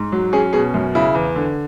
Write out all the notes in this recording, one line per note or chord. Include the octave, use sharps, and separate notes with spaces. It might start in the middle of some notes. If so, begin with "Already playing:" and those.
Already playing: G#2
F#3
C#4 G#4
B2 G#4
F#2
C#3 E4
E2
D3